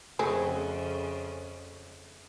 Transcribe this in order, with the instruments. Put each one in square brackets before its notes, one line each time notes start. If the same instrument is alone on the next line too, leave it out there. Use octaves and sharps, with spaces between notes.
[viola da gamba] F2 C#3 [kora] A3 F#4 [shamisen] C4 G#4